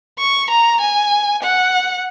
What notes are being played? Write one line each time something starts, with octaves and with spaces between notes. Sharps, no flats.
C#6
A#5
G#5
F#5